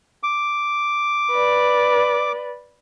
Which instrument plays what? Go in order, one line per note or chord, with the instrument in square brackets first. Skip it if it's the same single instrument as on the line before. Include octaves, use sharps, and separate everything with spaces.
[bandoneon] D6
[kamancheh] B4 D5